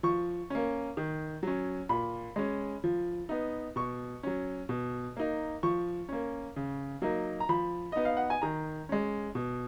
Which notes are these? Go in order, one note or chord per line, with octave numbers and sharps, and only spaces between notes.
F3 C#6
A#3 C#4
D#3
F#3 C#4
A#2 B5
G#3 C#4
F3
B3 D#4
B2 C#6
F#3 C#4
B2
A#3 D#4
F3 C#6
A#3 C#4
C#3
F#3 A#3 D#4
A#5
F3 B5
B3 D#4 D#5
F5
F#5
G#5
D#3 A#5
G#3 C#4
B2